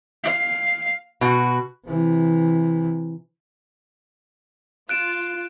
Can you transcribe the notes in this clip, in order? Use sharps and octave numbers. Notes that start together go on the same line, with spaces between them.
F5
B2 F#4
C3 E3
F4 F#6 D7 E7